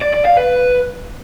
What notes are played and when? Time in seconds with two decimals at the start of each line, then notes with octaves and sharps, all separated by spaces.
0.01 D5
0.13 D5
0.25 F5
0.37 B4